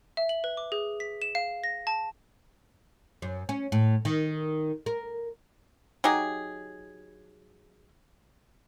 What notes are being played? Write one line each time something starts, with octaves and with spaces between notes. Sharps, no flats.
E5
F#7
B4
D6
G#4
B6
E7
F5
A#6
A5
F#2
C#4
A2
D#3
A#4
F#3 D#4 G4 G#4